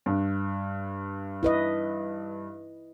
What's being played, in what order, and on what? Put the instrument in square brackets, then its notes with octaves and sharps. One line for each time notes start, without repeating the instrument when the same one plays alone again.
[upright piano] G2
[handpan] E4 B4 D#5